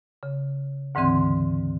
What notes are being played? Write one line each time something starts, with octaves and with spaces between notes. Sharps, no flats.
C#3
D2 G#2 D3 E3 C4 C6